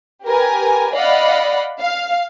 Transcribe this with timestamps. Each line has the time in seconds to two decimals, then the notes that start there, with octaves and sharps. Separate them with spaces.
0.24 G4 A#4 B4 G#5
0.93 D5 D#5 F5 F#5 B5
1.81 F5